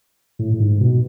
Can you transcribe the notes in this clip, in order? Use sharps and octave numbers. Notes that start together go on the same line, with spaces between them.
A2
A2
G#2
B2